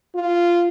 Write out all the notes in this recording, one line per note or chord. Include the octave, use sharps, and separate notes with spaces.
F4